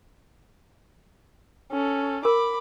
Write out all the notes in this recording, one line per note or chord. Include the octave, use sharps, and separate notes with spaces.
C#4 A4
A#4 B5 D6